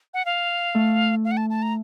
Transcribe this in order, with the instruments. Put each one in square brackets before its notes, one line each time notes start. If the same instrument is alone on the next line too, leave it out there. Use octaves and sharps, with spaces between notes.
[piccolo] F#5
F5
[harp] A3
[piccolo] F5
F#5
A5
A5
A#5